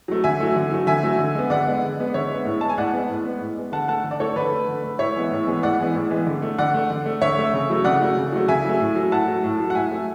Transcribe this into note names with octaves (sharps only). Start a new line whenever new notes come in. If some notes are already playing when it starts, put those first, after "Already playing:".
F#3 A3
D3 E5 G#5
F#3 A3
D3
F#3 A3
D3 E5 G#5
F#3 A3
D3
G#3 B3
D3 D5 F#5
G#3 B3
D3
G#3 B3
D3 C#5 E5
G#3 B3
A2
G#3 B3 A5
G#5
A2 D5 F#5
G#3 B3
A2
G#3 B3
A2
G#3 B3
D3 F#5 A5
A3 F#5 A5
D3
D5
A3 A4 C#5
D3 B4 D5
A3
D3
A3
A2 C#5 E5
E3 G#3 B3
A2
E3 G#3 B3
A2 D5 F#5
E3 G#3 B3
A2
E3 G#3 B3
D3
A3
D3 D5 F#5
A3
D3
A3
D3 C#5 E5
A3
C#3
F#3 A3
C#3 D5 F#5
F#3 A3
C#3
F#3 A3
C#3 E5 G#5
F#3 A3
A2
F#3 A3
A2 F#5 A5
F#3 A3
A2
F#3 A3
F#5
A2 E5 G#5
F#3 A3